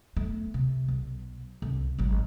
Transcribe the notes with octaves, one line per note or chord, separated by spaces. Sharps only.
A3 B3
C3
B1
C2
G#1 F#3